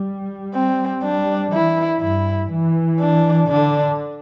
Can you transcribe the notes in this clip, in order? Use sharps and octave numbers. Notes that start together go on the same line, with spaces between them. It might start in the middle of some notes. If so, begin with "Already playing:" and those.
Already playing: G3
C4
G3 D4
E3 E4
G2 E4
E3
D4
D3 D4